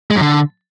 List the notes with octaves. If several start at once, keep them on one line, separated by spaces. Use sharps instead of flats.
G#3
F#2
D3